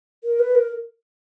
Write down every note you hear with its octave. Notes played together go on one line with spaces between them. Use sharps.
A#4
B4
A#4